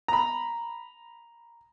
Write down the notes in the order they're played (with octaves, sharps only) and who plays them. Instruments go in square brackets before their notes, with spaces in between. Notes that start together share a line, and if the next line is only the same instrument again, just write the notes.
[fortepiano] A#5 B5